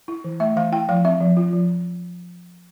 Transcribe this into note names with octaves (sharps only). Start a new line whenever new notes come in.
E4
E3
A3 E5
E3 F5
E4 G5
F3 F5
C4 E5
F3
F4
F3